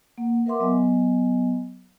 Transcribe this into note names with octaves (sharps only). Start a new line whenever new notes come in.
A#3 F#5
A#4 B4 E5 F#5 C6 D6
F#3 B3 D#5 G#5